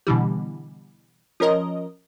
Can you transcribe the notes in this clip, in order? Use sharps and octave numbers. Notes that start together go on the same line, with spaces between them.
B2 D3 E3 G3
F3 C#4 A#4 D#5